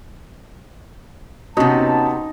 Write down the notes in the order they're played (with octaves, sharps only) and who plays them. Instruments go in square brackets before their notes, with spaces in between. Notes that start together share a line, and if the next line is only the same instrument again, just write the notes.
[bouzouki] C3 B3 [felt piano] C#4 F#4 [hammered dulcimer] D#4 [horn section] A5